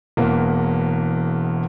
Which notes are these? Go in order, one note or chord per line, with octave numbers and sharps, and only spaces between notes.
E1 E2 A#3